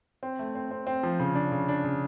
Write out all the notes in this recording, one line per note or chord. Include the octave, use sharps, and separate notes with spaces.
C4
A3
C4
C4
C4
F3
C#3
D4
C#3
D4
C#3